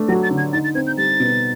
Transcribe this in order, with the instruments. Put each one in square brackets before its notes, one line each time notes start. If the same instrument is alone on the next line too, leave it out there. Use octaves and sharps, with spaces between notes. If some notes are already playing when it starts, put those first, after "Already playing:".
Already playing: [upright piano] A3 D4
[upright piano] F#3 [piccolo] A#6
[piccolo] A6
[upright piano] D3
[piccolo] G#6
[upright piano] D#4 [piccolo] A6
[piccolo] A6
[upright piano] C4 [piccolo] G#6
[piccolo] G6
[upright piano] G3 [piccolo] A6
[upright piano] B2